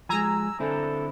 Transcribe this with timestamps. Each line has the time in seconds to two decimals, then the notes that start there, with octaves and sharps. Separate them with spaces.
0.09 F3 G#3 G#5 A#5 E6
0.60 D3 C4 E4 A4